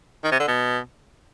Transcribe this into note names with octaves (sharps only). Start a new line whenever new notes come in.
D#3
C3
D3
B2